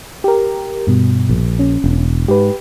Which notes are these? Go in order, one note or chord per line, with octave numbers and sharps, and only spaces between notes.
G4 A#4
G2 B2
A#1
C#4
E1
G#2 G4 B4